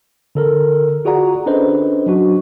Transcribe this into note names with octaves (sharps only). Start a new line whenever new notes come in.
D3 A4 A#4
F4 F#4 G#4 D5 F#5 A#5
C#4 D4 A4 B4 C5 D#5
F#3 D4 F#4